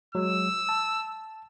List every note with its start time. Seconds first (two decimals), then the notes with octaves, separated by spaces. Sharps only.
0.15 F#3 G#3 E6
0.69 A5